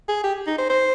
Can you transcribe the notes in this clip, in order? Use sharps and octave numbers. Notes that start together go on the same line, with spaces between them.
G#4
G4
D#4
C5
C5